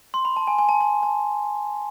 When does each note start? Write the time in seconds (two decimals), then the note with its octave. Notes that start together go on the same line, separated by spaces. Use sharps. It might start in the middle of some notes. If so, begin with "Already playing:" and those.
0.14 C6
0.25 B5
0.36 A5
0.47 G#5
0.59 G#5
0.69 A5
0.81 A5
1.03 A5